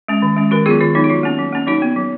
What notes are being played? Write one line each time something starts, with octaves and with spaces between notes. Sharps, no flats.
G#3 C#4
D#3
G#3 C#4
D#3 F#4 A#4
F#3 B3 F4 G#4
D#3 F4
F#3 B3 D#4
F#4
F#3 F4
A#3 C#4
F#3
A#3 C#4
F#3 D#4 F#4
B3
F#3